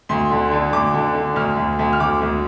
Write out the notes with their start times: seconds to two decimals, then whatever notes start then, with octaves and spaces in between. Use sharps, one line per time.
0.09 D2 C6
0.31 D3
0.52 D3
0.73 D2 D6
0.93 D3
1.15 D3
1.36 D2 F6
1.57 D2
1.79 D2
1.93 F6
2.00 D2 D6
2.21 D2